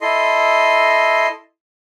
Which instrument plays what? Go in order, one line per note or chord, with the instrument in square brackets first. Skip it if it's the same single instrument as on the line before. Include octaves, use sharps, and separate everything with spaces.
[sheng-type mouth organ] E4 A4 D#5 C6